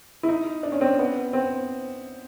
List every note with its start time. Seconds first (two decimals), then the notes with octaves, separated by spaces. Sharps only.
0.23 E4
0.29 D#4
0.63 D4
0.72 C#4
0.81 C4
0.99 B3
1.33 C4